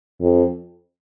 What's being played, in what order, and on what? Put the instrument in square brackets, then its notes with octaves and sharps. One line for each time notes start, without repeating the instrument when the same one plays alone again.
[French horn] F2